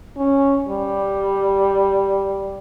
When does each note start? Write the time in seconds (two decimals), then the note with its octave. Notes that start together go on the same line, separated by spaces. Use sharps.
0.17 C#4
0.69 G3